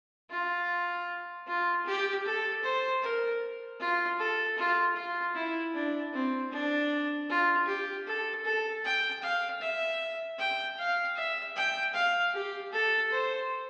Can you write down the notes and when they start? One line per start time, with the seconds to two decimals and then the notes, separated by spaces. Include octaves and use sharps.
0.30 F4
1.47 F4
1.86 G4
2.25 A4
2.63 C5
3.02 A#4
3.80 F4
4.19 A4
4.58 F4
4.96 F4
5.35 E4
5.74 D4
6.13 C4
6.51 D4
7.29 F4
7.67 G4
8.07 A4
8.45 A4
8.85 G5
9.22 F5
9.61 E5
10.38 G5
10.78 F5
11.16 E5
11.56 G5
11.94 F5
12.33 G4
12.72 A4
13.11 C5